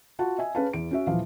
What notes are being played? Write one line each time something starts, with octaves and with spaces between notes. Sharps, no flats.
F4 F#4 F#5 A5
D#5 E5 G#5
C#4 G#4 B4 F5 A5
E2 D7
C#4 F#4 E5
D#1 E3 F3 F5